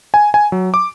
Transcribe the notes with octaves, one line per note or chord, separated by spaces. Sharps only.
G#5
G#5
F#3
D6